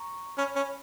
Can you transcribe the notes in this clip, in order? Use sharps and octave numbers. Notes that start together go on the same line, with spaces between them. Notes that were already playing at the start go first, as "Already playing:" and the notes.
Already playing: A#5 C#6
C#4 G#5 B5
C#4